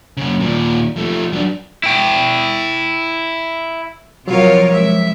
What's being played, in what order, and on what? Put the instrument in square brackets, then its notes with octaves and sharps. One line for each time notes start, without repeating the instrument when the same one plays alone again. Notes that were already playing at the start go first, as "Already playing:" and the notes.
[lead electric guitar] F#2 C#3
D#2 A#2
F3 A3
F#3 D4
[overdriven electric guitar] E4 G5
[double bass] C3 F3 [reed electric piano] F#3 [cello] F4 A#4 [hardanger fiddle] C#5 F5
[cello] G#3 [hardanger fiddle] E5